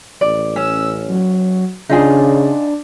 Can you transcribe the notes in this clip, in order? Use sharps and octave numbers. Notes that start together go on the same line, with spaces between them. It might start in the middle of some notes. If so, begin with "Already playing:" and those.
A1 D5
C#4 E6
F#3
C#3 D4 D#4 F4 G#4